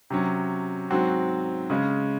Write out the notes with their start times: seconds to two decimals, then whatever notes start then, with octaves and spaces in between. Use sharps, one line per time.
0.10 C3 F#3 C#4
0.90 G#2 F#3 C4 F#4
1.70 C#3 G#3 C#4